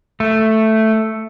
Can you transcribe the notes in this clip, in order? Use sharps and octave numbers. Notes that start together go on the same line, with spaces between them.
A3